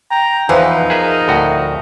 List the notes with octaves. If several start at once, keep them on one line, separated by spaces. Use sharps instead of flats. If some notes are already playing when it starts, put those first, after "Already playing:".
G5 A#5
E2 E3 F3 D#4 B4
G#4 A#4 B4 E5
D2 A2 F#4